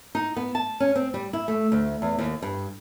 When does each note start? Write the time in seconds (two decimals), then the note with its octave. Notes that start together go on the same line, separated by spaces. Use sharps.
0.15 D#4
0.37 B3
0.55 A5
0.80 C#4
0.95 C4
1.14 G3
1.33 E4
1.48 A3
1.72 D2
2.02 E2
2.18 D#2
2.42 G2